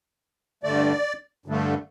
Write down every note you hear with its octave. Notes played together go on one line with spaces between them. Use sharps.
G2 D3 A3 D5
G2 D3 A3